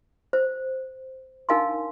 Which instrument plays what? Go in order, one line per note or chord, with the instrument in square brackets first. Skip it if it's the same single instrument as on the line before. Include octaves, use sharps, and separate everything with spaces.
[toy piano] C5
D4 D#4 A#4 F5 G#5 C6